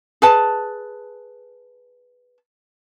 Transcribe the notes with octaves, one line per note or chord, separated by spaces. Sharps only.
G#4 B4 A5